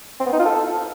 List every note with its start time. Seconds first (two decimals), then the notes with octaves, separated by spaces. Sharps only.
0.20 C4
0.26 B3
0.33 D#4
0.39 F4
0.46 A4